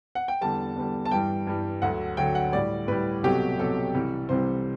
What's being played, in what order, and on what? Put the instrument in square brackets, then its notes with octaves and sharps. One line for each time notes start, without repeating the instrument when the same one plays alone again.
[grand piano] F#5
G5
E2 D3 G3 A5
E2 D3 G3
A5
G2 E3 G3 G5
G2 E3 G3
D2 D3 F#3 F#5
D2 D3 F#3 G5
F#5
A2 G3 D5
A2 G3 B4
C2 B2 F#3 A3 G4
C2 B2 F#3 A3 A4
C2 C3 E3 G3
C2 C3 E3 G3 C5